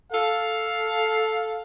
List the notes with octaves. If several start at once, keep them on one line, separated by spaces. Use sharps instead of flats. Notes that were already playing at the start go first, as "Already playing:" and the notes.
A4 F5